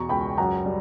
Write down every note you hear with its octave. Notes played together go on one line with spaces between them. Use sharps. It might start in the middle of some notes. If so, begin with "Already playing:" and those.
Already playing: E2 B2 A#5 C#6
C#2 G5 B5
F#2 F#5 A#5
G3